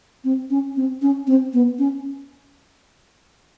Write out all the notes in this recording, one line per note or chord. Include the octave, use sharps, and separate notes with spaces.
C4
C#4
C4
C#4
C4
B3
C#4